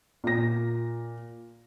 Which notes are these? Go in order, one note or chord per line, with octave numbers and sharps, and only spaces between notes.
A#2 A#6